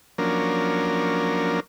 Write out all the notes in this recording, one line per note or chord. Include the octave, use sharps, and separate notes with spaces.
F3 F#3 A#3 C#4 D4 A#4